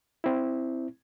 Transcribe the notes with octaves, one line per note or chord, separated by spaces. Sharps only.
C4 E4